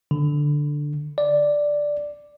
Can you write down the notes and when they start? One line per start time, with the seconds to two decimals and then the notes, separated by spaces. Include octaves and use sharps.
0.11 D3
1.18 D5